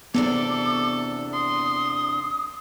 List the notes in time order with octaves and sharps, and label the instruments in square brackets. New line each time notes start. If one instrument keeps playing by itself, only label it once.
[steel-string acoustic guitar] E2 C3 D4 [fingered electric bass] B3 [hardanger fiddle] A4 [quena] D6
[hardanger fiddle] C6 [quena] D#6